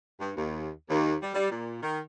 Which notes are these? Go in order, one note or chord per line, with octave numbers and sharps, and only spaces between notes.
G2
D#2
D#2
G3
G3
A#2
D#3